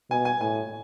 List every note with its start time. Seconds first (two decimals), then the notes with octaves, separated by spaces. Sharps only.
0.11 B2 G#5
0.25 G#5
0.41 A2 G#5